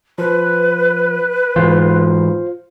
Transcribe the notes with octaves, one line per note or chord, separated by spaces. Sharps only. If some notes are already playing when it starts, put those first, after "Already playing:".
F3 B4
G#2 E3 F4 C5